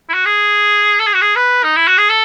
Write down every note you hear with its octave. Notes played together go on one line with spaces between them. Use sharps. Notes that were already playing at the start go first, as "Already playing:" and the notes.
E4
F#4
G#4
A4
G#4
F#4
G#4
B4
D#4
E4
F#4
G#4
A4